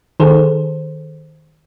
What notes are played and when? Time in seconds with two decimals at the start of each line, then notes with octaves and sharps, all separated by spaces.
0.20 D#3 G#4 A4 C5